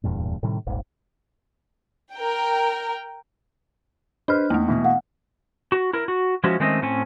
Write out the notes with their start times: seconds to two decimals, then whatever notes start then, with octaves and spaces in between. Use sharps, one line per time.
0.04 D1 E2 G2 A#2
0.43 A2 C3 D#3 G3
0.67 D#1 G#1
2.14 A#4 G5
4.28 D4 B4 C5 D#5 F6
4.50 E2 A3 A#3
4.68 B2 E3
4.84 F5 F#5
5.72 F#4
5.93 E4 A#4
6.08 F#4
6.44 F3 G#3 C#4 E4 F#4
6.60 D#3 G#3 A3 C4 C#4 D#5
6.82 A2 C4 C#4 G#5